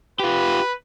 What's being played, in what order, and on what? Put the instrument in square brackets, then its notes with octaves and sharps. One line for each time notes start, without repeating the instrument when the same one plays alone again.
[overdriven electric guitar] F4 G4 [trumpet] B4